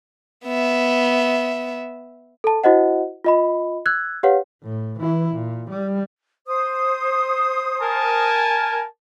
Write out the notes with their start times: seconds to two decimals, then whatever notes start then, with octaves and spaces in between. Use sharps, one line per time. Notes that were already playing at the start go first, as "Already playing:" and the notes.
0.45 B3 E5
2.44 A4 A5
2.64 E4 F#4 C5 D#5 F#5
3.24 F4 D#5 B5
3.86 E6 F#6 G#6
4.23 G4 B4 C#5 F5 F#5
4.63 A2
4.99 E3 E4
5.33 A#2
5.70 G3
6.47 C5 D#6
7.82 A#4 G#5 A5